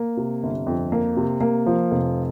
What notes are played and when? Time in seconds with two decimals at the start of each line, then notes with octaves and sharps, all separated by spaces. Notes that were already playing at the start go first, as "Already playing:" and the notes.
Already playing: A#3
0.17 C3
0.43 G1
0.67 F2
0.92 A#3
1.17 C3
1.41 A#3
1.66 F3
1.91 F1